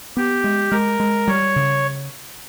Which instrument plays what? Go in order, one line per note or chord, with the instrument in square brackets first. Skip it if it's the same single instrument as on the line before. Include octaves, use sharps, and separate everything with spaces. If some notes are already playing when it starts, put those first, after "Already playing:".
[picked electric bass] B3 [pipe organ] G4
[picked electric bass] G#3
[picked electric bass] G#3 [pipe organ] A#4
[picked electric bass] G#3
[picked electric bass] G3 [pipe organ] C#5
[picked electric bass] C#3